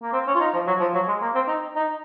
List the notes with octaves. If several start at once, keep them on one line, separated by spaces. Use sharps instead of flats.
A#3
C4
C#4
F4
D#4
F3
F#3
F3
F#3
G#3
A#3
C4
D#4
D#4